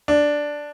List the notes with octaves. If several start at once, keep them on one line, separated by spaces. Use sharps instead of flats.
D4